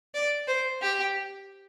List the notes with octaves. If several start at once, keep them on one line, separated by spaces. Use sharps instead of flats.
D5
C5
G4